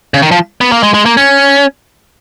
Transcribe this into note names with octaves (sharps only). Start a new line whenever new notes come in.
C#3
D#3
F3
B3
A#3
G#3
G#3
A#3
C#4